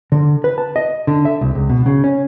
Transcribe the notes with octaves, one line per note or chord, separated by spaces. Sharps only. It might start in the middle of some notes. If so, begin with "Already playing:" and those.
D3
B4
A5
D#5
D3
E5
C2
C#2
B2
C#3
C#4